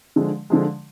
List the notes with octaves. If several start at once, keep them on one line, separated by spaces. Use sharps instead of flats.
D3 F3 G#3
D3 F3 G#3